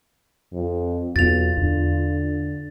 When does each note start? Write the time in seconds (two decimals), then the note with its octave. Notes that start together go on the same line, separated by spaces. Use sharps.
0.53 F2
1.16 B1 E2 B3 F4 A6 F7
1.57 E2 D3